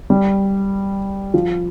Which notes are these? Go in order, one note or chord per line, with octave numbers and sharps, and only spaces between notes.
G3
F3